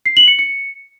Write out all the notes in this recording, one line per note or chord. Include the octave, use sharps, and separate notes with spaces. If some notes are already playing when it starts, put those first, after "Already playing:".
C7
F#7
C#7
C#7